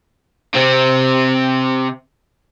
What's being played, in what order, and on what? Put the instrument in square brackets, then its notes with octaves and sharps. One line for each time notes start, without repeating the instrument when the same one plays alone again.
[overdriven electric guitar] C3 C4